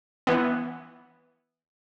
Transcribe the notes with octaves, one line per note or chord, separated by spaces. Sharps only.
E3 B3